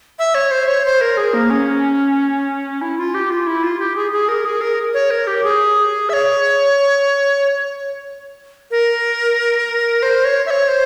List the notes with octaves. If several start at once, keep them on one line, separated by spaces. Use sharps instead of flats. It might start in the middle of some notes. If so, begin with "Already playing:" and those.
E5
C#5
C5
C#5
C5
A#4
G#4
A#3
C#4
E4
F4
G4
F4
E4
F4
G4
G#4
G#4
A#4
G#4
A#4
C#5
A#4
G4
G#4
E5
C#5
A#4
C5
C#5
E5
C#5
C5